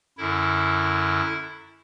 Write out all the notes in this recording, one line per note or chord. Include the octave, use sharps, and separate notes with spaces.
F#2 D3 E4